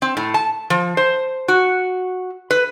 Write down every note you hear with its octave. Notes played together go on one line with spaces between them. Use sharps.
C4
A2
A5
F3
C5
F#4
B4